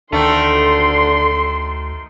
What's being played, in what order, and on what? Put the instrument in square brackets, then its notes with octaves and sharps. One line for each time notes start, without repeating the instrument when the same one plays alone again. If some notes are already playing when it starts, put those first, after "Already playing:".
[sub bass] D2 [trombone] D3 [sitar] D#3 A3 [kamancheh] A4 C6